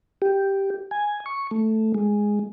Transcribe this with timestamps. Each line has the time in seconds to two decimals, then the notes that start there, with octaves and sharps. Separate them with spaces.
0.22 G4
0.91 G#5
1.26 C#6
1.51 A3
1.94 G#3